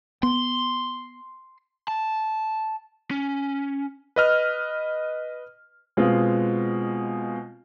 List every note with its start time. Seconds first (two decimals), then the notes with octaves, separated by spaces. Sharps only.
0.23 B3 C6
1.88 A5
3.11 C#4
4.16 B4 D#5 F6
5.97 B2 G#3 C4 F4